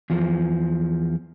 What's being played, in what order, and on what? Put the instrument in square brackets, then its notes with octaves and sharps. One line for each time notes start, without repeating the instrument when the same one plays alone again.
[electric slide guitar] E2 F3